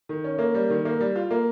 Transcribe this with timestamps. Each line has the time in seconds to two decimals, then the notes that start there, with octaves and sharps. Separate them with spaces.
0.09 D#3
0.24 C#4
0.39 A#3
0.55 G3
0.70 D#3
0.85 A#3
1.01 G3
1.16 F4
1.31 A#3